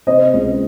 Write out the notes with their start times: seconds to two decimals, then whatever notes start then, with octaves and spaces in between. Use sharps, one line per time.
0.07 C3 C5 D#5
0.34 C#2